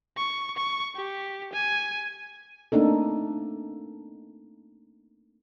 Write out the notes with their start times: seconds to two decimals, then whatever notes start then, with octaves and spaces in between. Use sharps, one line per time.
0.17 C#6
0.57 C#6
0.96 G4
1.53 G#5
2.72 A3 A#3 C4 D4 D#4 A4